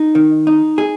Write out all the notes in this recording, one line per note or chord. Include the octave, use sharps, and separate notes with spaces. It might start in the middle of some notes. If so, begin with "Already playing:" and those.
Already playing: D#4
D#3
D#4
G#4